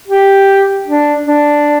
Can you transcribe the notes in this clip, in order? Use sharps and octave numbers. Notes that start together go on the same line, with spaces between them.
G4
D4
D4